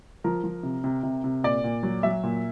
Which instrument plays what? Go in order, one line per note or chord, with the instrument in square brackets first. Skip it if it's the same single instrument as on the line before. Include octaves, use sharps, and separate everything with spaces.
[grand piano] F3 A#4
F3
C3
C3
C3
C3
A#2 D5
A#2
F#3
F#3 E5
A#2